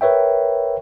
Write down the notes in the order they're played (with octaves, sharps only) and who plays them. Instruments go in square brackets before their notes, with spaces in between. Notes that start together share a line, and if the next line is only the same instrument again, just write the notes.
[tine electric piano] A#4 B4 C#5 E5 G5